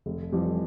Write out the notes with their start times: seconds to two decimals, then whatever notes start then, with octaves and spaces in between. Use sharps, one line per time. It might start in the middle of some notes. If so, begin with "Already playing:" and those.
0.06 F1
0.32 F2 E3 G3